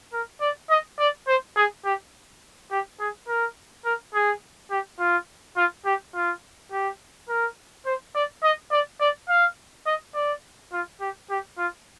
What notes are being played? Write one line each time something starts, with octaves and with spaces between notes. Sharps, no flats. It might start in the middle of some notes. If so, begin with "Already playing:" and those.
A#4
D5
D#5
D5
C5
G#4
G4
G4
G#4
A#4
A#4
G#4
G4
F4
F4
G4
F4
G4
A#4
C5
D5
D#5
D5
D5
F5
D#5
D5
F4
G4
G4
F4